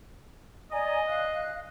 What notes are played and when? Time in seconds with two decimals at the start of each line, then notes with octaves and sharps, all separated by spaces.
0.72 D5 D#5 G#5 A#5
1.08 F5 F#6